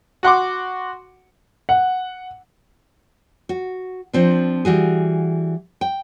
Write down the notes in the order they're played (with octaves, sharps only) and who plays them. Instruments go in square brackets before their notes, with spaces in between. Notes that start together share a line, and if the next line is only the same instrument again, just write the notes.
[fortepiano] F#4 F#5 C6 D6
[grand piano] F#5
[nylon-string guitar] F#4
F3 C4 D4
E3 G3 F#4 G#4
G5